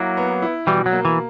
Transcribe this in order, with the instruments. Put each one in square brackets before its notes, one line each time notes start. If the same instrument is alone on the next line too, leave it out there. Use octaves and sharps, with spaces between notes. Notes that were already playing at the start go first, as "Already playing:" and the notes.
Already playing: [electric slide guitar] F#3 A#3 [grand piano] E4
[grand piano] B3
E4
[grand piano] B2 [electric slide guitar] E3 G3
[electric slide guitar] F#3
[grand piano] A#3
[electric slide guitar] E3